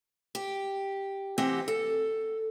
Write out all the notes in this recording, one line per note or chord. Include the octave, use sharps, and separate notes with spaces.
G4
E3 C4 G4 D#5 F#5
A4